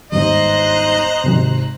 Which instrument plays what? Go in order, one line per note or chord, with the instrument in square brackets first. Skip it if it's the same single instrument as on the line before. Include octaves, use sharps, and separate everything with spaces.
[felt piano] G1 D#2 G#2 [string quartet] C5 A#5 F#6 [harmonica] D#5
[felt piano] G#1 G#2 C3